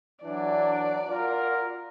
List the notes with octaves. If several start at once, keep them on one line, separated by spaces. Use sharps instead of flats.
E3 F#3 D4 D5
F4 F#4 A#4